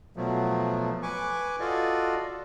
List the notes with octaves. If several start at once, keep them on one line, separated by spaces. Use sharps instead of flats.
B2 F3 F#3 A3
B4 G#5 C#6 D6
F4 F#4 A4 D5 D#5